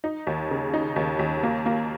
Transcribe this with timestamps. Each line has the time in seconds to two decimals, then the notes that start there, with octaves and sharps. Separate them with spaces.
0.04 D#4
0.27 D#2
0.51 C#3
0.74 D#4
0.96 D#2
1.19 D#2
1.43 A#3
1.66 A#3